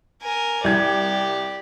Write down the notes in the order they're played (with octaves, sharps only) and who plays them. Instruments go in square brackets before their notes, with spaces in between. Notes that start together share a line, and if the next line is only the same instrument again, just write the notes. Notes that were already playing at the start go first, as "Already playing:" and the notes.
[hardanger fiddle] A#4 G#5
[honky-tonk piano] C2 G#6 [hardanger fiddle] G4 D5